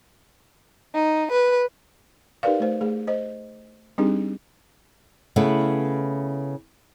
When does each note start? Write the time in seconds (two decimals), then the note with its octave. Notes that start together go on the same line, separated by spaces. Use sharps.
0.95 D#4
1.31 B4
2.43 D#4 G4 A#4 B4 D5 F5
2.60 A3 C5
2.81 A3 G#4
3.07 C5 D#5
3.98 G3 C4 D4 D#4 G4 G#4
5.36 C#3 A3 B3 E4